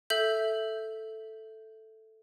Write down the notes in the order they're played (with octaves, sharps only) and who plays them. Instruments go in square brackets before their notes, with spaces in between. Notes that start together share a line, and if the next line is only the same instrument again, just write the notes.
[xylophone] A4 E5 G6